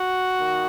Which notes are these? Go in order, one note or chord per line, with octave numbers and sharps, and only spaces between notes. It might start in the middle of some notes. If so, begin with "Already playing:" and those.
Already playing: F#4
D#3 A#3